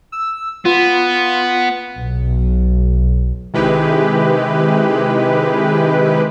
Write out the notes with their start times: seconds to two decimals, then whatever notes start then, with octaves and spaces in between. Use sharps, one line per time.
0.12 E6
0.65 B3 F4
2.01 B1
3.54 C3 D#3 G#3 E4 G4 B4